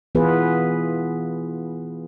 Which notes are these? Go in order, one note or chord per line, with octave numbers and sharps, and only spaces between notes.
E3 B3 F4 G#4 B4